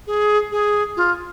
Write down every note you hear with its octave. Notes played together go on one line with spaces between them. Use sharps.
G#4
G#4
F4